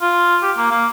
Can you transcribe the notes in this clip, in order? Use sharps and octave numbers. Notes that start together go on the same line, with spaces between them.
F4
G4
A#3
A#3